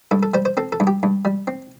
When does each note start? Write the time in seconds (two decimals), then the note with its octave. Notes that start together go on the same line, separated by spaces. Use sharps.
0.11 G2 A4
0.23 A4
0.34 G3 C5
0.45 C5
0.57 C4 A4
0.72 A4
0.80 G2
0.87 G4
1.03 G2
1.25 G3
1.47 C4